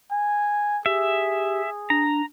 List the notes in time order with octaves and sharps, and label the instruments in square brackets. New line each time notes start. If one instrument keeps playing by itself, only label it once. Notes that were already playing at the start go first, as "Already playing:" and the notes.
[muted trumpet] G#5
[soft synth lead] G4 [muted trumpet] G#4 [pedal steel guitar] E5
[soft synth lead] D4 [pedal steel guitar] A#5